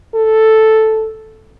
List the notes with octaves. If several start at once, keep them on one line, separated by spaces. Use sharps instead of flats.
A4